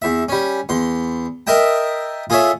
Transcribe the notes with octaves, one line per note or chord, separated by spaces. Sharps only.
E2 E5
G3 C#4
E2 C6
A#4 D#5 E5 G5 A5
F4 G#4 A4 C#5 E5